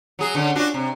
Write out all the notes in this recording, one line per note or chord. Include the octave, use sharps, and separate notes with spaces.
F#3 G#4
D3 C#4
D4 F4 F#4
C3